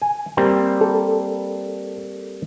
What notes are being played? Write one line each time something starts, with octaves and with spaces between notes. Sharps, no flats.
G#5
G3 A#3 C4
A4